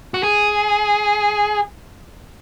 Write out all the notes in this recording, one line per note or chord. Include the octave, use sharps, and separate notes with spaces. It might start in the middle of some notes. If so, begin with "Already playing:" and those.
F#4
G#4